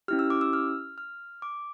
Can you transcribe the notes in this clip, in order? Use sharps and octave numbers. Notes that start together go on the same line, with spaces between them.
C#4 E4 G4 F6
E6
D6
E6
F6
F6
D6